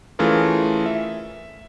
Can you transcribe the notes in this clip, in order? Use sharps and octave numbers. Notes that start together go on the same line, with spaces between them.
E3 A3 C#4 F4 G#4 A#4
E5